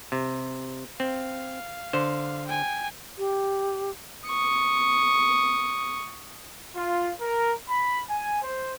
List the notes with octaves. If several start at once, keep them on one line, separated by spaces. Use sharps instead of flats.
C3
C4 F5
D3 C5
G5 G#5
G4
C#6 D#6
F4
A#4
B5
G#5
C5